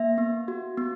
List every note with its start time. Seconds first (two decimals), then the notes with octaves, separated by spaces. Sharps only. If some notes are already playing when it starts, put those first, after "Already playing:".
Already playing: A#3 E5
0.18 B3
0.48 F#4
0.78 B3